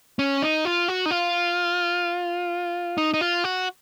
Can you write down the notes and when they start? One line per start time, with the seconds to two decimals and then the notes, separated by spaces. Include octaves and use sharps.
0.19 C#4
0.42 D#4
0.65 F4
0.88 F#4
1.06 D#4
1.11 F4
2.98 D#4
3.14 D#4
3.21 F4
3.44 F#4